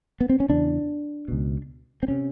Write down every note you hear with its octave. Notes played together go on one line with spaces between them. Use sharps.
B3
C4
C#4
E2 C#3 D4
C#2 B2
C4
C3 C#4